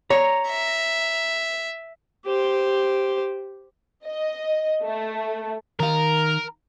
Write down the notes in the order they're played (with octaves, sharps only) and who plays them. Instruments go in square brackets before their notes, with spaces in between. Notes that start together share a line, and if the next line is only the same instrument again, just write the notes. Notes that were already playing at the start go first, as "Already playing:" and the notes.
[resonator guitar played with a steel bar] C#5 [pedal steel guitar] A#5
[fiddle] E5
[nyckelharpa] G4 C5
[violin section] D#5
A3
[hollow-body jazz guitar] D#3 F5 [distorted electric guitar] A#4